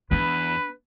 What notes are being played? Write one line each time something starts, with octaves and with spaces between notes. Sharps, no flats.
E2 B3 D4 B4 B5